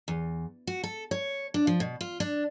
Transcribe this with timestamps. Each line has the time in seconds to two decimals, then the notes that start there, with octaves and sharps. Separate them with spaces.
0.08 E2
0.67 F#4
0.83 A4
1.11 C#5
1.54 D4
1.67 F3
1.80 B2
2.01 F4
2.20 D4